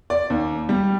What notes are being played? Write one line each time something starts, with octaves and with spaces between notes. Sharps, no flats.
D5
D#2
G3